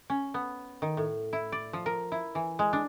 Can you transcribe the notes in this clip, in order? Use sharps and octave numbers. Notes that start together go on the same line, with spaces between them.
C#4
B3
D#3
A2
E4
D5
F3
A#4
E4
E3
G#3
D4